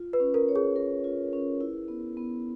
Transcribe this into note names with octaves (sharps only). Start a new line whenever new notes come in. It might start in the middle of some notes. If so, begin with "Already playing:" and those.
Already playing: F4
B4
C#4
A#4
C#5
G#4
A#4
F4
C#4
E4
B3
B3